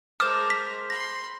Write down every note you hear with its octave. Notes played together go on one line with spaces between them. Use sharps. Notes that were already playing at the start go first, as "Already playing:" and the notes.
G#3 A#4 C5 A5 D6 F6
B6
B5 C6 A#6